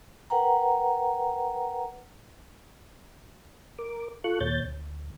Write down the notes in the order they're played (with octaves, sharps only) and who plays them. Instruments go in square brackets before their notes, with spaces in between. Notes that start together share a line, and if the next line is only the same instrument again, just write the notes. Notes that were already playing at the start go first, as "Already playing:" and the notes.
[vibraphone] A#4 B4 F#5 G5 A#5
[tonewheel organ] A#4 D6
F4 A4 C#6 F#6
D#2 A#2 C#5 G6 A6
D2